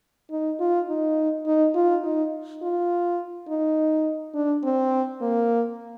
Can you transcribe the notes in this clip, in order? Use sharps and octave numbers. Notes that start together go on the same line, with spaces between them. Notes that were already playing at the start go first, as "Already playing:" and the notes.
D#4
F4
D#4
D#4
F4
D#4
F4
D#4
D4
C4
A#3